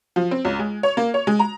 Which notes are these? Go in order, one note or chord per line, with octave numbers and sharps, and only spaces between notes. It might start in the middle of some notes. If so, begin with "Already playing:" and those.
F3
C4
C#2
G#3
C#5
A#3
C#5
G#3
A#5